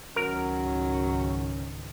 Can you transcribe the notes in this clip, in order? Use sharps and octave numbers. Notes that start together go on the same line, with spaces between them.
C#2 G#2 D#3 F#3 C#4 A#4